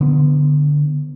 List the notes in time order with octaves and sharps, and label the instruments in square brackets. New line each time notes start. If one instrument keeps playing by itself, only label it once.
[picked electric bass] D3 B3